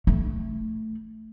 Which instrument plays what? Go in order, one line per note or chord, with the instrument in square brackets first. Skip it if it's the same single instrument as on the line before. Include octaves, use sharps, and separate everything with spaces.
[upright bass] A3